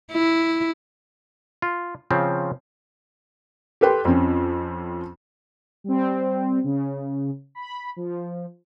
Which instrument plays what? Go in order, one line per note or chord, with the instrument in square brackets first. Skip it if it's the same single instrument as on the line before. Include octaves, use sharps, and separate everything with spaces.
[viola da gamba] E4
[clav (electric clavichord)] F4
C#3 F3 C4
[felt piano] G4 A4 B4 G5 C6
F2 F3 C4 C#4
[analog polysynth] G3 C4
C#3
B5
F3